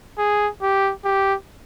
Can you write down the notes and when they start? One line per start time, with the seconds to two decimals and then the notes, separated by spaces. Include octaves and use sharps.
0.18 G#4
0.62 G4
1.05 G4